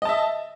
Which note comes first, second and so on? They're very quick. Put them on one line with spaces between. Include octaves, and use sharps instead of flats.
D#5 A5 E5